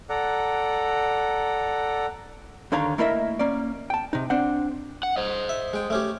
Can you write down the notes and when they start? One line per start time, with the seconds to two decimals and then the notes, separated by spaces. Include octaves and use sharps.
0.10 A4 D5 F#5 A#5
2.72 D#2 D3 D#3 C#5 F5 A#5
2.98 A3 A#3 E4 A#4 D#5 E5
3.39 A#3 C#4 D5
3.90 G5 A5
4.13 C3 D#4
4.30 C4 D4 C5 F#5
5.03 F#5
5.17 C5 D#5
5.49 E5
5.73 G#3 G5
5.90 A3 C#4 G4